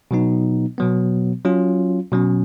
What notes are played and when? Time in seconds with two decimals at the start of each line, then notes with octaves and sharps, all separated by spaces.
0.11 B2 F#3 B3 D#4
0.78 B2 F#3 B3
1.45 F#3 C#4 F4
2.12 B2 F#3 C#4